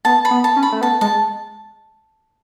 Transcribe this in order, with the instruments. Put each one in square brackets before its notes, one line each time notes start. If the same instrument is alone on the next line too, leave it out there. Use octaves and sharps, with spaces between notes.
[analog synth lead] B3 [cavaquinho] A5
[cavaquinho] B5
[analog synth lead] B3
[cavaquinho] A5
[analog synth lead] C#4
[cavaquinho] B5
[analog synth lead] A3
[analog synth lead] B3 [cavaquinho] A5
[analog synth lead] G#3 [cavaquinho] A5